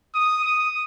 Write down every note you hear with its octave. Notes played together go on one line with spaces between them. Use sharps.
D#6
D#6